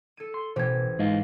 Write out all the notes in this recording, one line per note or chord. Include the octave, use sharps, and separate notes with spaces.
A4 G#6 D#7
C6
A1 B2 E3 G4 C5 G#6
G#2 G#4 D#5 F5